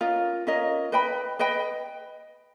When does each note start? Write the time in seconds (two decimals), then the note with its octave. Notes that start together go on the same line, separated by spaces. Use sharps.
0.01 C#4 F4 A#4 D#5
0.47 C#4 F4 A#4 D#5
0.92 B4 D#5 G5 B5
1.39 B4 D#5 G5 B5